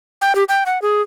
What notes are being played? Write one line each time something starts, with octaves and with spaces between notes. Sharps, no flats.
G5
G4
G5
F#5
G#4